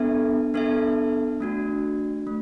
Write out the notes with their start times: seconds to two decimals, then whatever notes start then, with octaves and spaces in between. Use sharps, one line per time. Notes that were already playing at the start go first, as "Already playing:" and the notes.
Already playing: B3 D4 A4 E5
0.54 B3 D4 A4 E5
1.40 A3 D4 F#4
2.27 A3